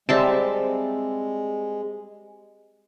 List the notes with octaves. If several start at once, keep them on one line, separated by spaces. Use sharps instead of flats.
G3 G#3 C4 E5 A5